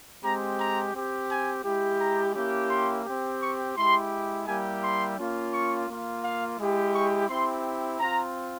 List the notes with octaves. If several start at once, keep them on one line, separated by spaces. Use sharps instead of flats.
G#3 C4 G4 A#5
A#5
C4 G4
G#5
G#3 E4 G4
A#5
A#3 C#4 E4 G4
C6
C4 G4
C#6
G#3 E4 G4 C6
G3 A#3 E4 G4 G#5
C6
A#3 C#4 F4
C#6
A#3
F4
F5
G#3 E4 G4
C#6
C4 E4 G4 C6
C4 F4 A#5